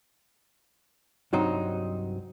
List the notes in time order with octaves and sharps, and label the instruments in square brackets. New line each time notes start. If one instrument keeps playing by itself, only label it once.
[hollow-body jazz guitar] C2 G2 F#3 C4 D#4